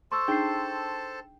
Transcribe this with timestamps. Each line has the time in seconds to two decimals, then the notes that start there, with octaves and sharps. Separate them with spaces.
0.12 A4 C5 A5 C6 C#6 E6
0.28 D4 D#4 G#4 G5 C7